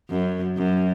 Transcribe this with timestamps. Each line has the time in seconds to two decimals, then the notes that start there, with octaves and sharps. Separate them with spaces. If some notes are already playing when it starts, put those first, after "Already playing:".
0.10 F#2
0.57 F#2